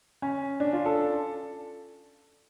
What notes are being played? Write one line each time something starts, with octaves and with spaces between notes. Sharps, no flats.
C#4
D4
F4
A4